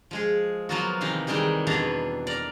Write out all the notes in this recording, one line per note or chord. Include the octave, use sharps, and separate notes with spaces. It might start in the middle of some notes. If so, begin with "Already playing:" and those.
F3 G#3 G#4
F3 F#3 A#3 B3 F4 F#4
C3 D#3 E3 D#4 F5
D#3 E3 G3 G#3 D#4
E2 B2 D4 B4 C#5 A#5
A#4 D5